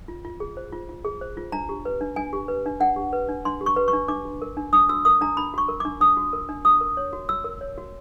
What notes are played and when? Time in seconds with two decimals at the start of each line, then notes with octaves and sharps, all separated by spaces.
0.08 F4
0.25 F4
0.40 G#4
0.57 C5
0.73 F4
0.89 F4
1.04 G#4
1.21 C5
1.37 F4
1.52 D4 A#5
1.69 G4
1.85 B4
2.01 D4
2.16 D4 G#5
2.33 G4
2.48 B4
2.66 D4
2.80 D4 F#5
2.96 G4
3.13 B4
3.29 D4
3.45 D4 C6
3.61 G4
3.66 C#6
3.76 B4
3.88 C#6
3.93 D4
4.08 D4 D6
4.25 F#4
4.42 A#4
4.57 D4
4.73 D4 D#6
4.89 F#4 E6
5.05 A#4 D#6
5.21 D4 A#5
5.37 D4 B5
5.54 F#4 C#6
5.69 A#4
5.80 D6
5.85 D4
6.00 D4 D#6
6.17 F#4
6.33 A#4
6.49 D4
6.65 F#4 D#6
6.81 A#4
6.97 C#5
7.13 F#4
7.29 F#4 E6
7.44 A#4
7.61 C#5
7.78 F#4